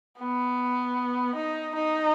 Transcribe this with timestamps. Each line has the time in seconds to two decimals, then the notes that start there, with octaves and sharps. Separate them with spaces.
0.18 B3
1.35 D#4
1.75 D#4